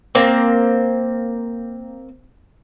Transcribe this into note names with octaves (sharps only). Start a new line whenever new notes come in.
A#3 C4